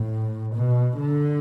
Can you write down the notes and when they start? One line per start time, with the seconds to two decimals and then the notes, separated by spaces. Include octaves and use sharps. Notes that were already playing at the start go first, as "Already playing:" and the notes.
Already playing: A2
0.56 B2
1.00 D3